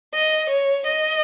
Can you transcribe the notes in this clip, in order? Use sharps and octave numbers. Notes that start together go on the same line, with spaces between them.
D#5
C#5
D#5